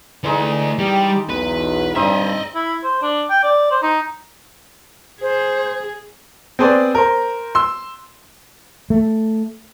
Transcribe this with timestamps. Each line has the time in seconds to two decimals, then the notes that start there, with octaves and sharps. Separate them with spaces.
0.24 E3 G#3 A3 D#4 D5
0.79 G3 G4
1.29 B1 E2 B4
1.96 G2 C4 D#4 D#5 E5
2.55 E4
2.83 C5
3.02 D4
3.30 G5
3.43 D5
3.71 C5
3.83 D#4
5.22 G#4 C5
6.59 C4 G#4 B4 C5 D5
6.95 A#4 C5
7.55 C6 E6
8.90 A3